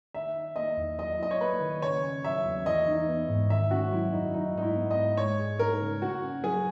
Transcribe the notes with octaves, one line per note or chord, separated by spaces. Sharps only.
D#3 E5
D#4
A#3 D#5
E2
F#3 D#5
E4 D#5
C#5
A#3 B4
D#3
C#3 C#5
C#4
F#3 E5
E2
E3 D#5
D#4
B3
G#2
D#3 E5
C#4 F#4
F#3 E4
F#2 D#4
F#3 D#4
G#2 D#4
E4
B3
D#5
G#2
G#3 C#5
G#4
D#4 A#4
C#3
C#3 F#4
C#4
F#3 G#4